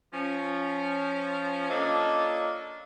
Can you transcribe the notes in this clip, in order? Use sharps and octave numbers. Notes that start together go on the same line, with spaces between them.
F3 C#4
A#3 D4 F4 A4 C#5 D#5